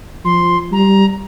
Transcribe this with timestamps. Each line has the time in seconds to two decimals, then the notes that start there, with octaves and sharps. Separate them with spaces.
0.25 F3 C6
0.72 G3 A#5